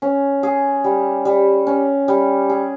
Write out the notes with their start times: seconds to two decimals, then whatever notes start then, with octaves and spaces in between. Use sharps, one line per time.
0.02 C#4
0.43 G#4
0.84 G3
1.25 G3
1.67 C#4
2.08 G3
2.50 G#4